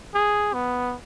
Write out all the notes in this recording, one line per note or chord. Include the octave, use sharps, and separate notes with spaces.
G#4
B3